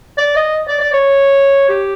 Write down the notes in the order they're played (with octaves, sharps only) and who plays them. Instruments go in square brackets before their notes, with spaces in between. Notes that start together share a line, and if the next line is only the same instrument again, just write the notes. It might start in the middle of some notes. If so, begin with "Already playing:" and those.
[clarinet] D5
D#5
D5
D5
C#5
G4